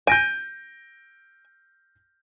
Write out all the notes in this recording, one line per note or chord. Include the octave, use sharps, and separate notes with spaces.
G#5 G6 A#6 D7